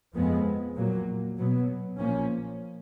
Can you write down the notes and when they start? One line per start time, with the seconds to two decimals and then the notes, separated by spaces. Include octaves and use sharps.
0.14 F2 F3 G#3 B3
0.77 A#2 F#3 A#3
1.38 B2 F#3 B3
1.99 A#2 F3 A#3 C#4